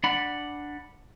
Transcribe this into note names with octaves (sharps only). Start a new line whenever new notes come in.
D4 F#5 B5